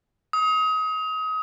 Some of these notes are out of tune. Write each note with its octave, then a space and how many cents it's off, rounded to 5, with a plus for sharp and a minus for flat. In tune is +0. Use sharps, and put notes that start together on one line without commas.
D#6 +30